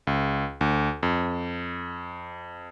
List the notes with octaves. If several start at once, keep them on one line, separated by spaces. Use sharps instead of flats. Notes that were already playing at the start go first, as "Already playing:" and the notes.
C#2
D2
F2